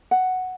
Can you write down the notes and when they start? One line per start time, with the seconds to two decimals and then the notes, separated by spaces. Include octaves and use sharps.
0.11 F#5